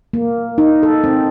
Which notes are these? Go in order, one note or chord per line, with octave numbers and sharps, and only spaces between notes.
A#3
D#4
A4
C4